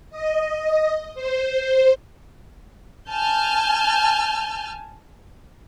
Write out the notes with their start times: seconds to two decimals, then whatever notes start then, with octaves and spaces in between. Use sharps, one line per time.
0.10 D#5
1.14 C5
1.46 C5
3.11 G#5 A5 F6 G6